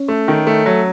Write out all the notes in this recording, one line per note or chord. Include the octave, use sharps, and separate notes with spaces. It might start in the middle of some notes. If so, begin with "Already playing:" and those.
Already playing: C#4
A3
D#3
A3
F#3